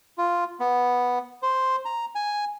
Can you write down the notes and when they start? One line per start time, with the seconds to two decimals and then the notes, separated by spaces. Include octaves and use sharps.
0.18 F4
0.60 B3
1.42 C5
1.85 A#5
2.15 G#5